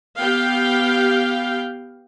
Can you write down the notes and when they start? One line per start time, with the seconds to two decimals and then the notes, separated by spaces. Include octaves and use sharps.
0.19 B3 G4 F5 G5